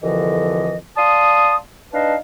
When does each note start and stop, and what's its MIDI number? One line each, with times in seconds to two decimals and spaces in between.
0.02 0.77 36
0.02 0.77 41
0.02 0.77 50
0.02 0.77 52
0.02 0.77 53
0.02 0.77 75
0.97 1.56 74
0.97 1.56 77
0.97 1.56 81
0.97 1.56 84
0.97 1.56 87
1.93 2.16 62
1.93 2.16 63
1.93 2.16 71
1.93 2.16 75
1.93 2.16 77
1.93 2.16 81